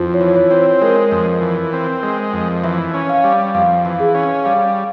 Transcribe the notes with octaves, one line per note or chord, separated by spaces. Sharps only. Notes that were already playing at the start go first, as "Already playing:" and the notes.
Already playing: F2 E4 F4 C5
C#5
E3
C#5
C4
C5
G#3 A#4
F2
E3
C4
G#3
F2
E3 E5
C#4
F5
G3
F2 F5
E3
G#4
C#4
G3 F5